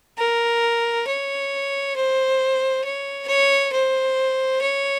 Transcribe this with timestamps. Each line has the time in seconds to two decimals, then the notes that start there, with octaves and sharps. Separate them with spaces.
0.18 A#4
1.07 C#5
1.96 C5
2.84 C#5
3.28 C#5
3.73 C5
4.61 C#5